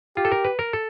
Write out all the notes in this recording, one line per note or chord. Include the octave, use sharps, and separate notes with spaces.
F4 G4
A4
A#4
B4
A#4
A4